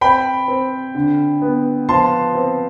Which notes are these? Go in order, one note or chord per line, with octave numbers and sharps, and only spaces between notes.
C4 G5 B5
C4
D3
B3
F3 A5 C6
C4